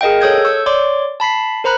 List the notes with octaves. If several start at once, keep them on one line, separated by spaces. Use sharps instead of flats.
G#4 A#4 D#5 F5 G5
A4 C#5 D#6 G6 G#6
C#6 E6 G6
C#5 D5 C6 D6
A5 B5 B6 C7
A#4 C5 A#5 B5 F#6